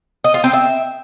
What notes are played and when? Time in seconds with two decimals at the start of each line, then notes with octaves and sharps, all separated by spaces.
0.24 D#5
0.34 F4
0.44 C4
0.53 E5